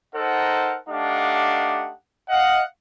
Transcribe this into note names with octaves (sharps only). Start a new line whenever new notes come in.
D#4 A4 A#4 C5 F#5
A3 D4 D#4 G4 F5 F#5
D#5 F5 F#5